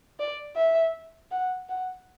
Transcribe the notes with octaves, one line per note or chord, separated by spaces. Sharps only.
D5
E5
F#5
F#5